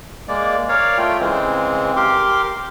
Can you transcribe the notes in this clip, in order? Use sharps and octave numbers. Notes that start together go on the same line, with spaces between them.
G#3 A#3 D5
A#4 C#5 D5 F5
A3 F4 G5
C#3 E3 G#3 C4
G4 A#4 C6 D6